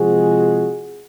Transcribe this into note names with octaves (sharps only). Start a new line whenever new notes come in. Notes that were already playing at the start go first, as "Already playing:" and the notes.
Already playing: C3 F3 G#3 F#4 G#4